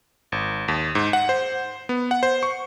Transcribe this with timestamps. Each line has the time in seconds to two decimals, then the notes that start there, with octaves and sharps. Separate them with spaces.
0.32 G#1
0.68 D#2
0.95 G#2
1.13 F#5
1.29 C5
1.89 B3
2.11 F#5
2.23 C5
2.43 C#6